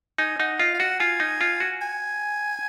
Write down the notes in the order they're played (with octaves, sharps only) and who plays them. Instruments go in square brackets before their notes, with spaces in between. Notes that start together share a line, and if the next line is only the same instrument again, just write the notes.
[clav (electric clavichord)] D#4 [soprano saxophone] G#5
[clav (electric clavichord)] D#4 [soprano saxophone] F#5
[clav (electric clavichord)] F4 [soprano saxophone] D#5
[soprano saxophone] F5
[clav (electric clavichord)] F#4 [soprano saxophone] F#5
[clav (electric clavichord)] F4 [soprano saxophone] G#5
[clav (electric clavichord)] D#4
F4
F#4
[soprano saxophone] G#5